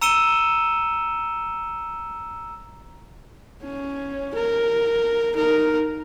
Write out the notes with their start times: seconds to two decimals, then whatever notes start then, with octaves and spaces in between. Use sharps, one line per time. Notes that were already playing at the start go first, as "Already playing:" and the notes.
0.01 A#5 E6 C#7 D#7 E7 G7
3.63 C#4
4.35 A#4
5.33 D#4 A#4